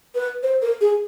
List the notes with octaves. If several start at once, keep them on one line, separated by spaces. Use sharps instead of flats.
B4
C5
A#4
G#4